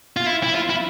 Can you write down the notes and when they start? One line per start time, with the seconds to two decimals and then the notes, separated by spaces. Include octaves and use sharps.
0.17 F4
0.26 E4
0.44 E4
0.55 F4
0.70 E4